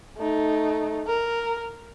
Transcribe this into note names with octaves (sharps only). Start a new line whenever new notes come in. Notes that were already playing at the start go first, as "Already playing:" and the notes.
A3 D#4
A#4